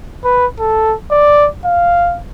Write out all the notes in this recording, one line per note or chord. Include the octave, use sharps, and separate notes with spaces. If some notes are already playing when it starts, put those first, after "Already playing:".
B4
A4
D5
F5